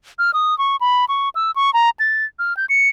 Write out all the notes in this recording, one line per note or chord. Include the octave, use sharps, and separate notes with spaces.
F6
D#6
C#6
B5
C#6
E6
C#6
A#5
A6
F6
G6
C#7